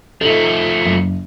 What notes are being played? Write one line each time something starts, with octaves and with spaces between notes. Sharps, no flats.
F3 A3 D#4 A4
F#1